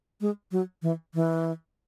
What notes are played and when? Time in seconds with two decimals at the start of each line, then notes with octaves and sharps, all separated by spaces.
0.21 G#3
0.52 F#3
0.82 E3
1.14 E3